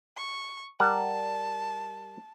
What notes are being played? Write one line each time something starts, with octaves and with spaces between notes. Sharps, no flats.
C#6
G3 A#4 F#5 A5